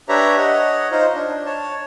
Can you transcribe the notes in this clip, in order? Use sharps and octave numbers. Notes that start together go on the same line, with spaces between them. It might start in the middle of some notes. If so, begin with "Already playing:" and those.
D4 G4 B4 C#5 E5 A#5
C#5 D#5 F#5
D#4 F4 C5 D#5
D4
C#5 A5